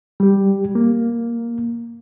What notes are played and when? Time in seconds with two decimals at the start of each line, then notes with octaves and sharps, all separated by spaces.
0.20 G3 G4
0.75 A#3